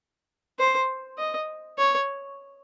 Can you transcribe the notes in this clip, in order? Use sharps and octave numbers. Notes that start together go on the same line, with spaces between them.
C5
D#5
C#5